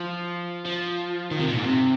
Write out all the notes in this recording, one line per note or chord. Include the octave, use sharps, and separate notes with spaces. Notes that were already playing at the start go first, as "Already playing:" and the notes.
Already playing: F3
F3
D#3
C3
A#2
G#2
C3